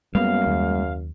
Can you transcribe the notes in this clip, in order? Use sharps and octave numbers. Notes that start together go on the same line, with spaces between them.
F#2 G3 G#3 A#3 B3 F5
D#2